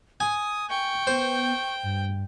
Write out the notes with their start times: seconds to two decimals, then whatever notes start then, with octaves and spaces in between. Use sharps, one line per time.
0.20 G#5 D#6
0.70 G5 C#6
1.07 B3 C5
1.83 G2